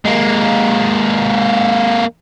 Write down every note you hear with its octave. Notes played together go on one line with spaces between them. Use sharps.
G#3 A#3